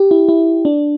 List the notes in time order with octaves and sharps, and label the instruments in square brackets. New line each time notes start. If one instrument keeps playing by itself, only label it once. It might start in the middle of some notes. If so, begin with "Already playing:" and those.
Already playing: [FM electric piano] G4
E4
E4
D4